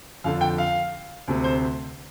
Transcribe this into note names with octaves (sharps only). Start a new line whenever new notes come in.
F2 D3 F5
G5
F5
D2 C3
C5